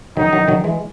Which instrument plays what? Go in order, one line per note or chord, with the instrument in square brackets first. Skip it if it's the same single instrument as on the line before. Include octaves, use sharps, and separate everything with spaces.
[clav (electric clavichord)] D#3 F#3 [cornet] D#4
[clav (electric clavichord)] D#3 F#3
D#3 F#3
E3 G#3